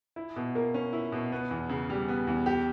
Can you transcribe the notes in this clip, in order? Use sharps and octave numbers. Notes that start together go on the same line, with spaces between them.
E4
B2
A#3
C#4
E4
B2
B3
E2
C#3
G3
B3
E2
G4